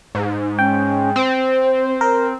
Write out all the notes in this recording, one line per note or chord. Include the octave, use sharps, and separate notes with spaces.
G#2
C#4 G5
C4 C5
A#4